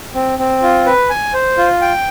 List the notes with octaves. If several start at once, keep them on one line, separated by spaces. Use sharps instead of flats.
C4
C4
F4
B4
G#5
C5
F4
G5